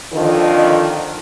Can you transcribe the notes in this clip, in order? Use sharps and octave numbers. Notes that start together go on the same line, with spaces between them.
F2 D3 D#3 F3